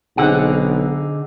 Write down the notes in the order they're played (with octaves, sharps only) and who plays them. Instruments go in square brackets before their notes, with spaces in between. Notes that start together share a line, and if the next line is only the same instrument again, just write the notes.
[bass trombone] B1 [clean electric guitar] D3 F#5 [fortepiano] C4 D#4 G#4